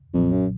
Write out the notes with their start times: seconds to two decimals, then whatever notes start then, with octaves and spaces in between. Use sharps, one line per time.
0.14 B1 F2 A#2 F#3
0.32 F#2